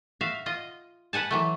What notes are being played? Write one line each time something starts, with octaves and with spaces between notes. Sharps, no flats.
F#4 E5 F5
F4 D#5
B4 F#5 G#5 A5
E3 F#3 A3